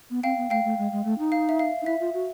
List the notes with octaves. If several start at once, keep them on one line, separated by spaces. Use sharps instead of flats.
B3
C4 F5 G5
B3
A3 F5 G5
A3
G#3
G#3
A3
D#4
F5
E5
F5
D#4
E4 E5
F4
F#4